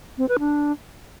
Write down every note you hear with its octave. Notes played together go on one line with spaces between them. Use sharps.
C4
B4
D4